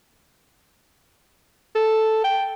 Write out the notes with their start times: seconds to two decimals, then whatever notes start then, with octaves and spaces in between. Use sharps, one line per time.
1.76 A4
2.24 G5